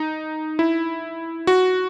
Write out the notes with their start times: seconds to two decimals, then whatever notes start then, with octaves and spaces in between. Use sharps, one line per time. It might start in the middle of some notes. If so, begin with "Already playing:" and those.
Already playing: D#4
0.59 E4
1.47 F#4